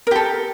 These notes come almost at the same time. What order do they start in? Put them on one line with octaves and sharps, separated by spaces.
A#4 G4 A4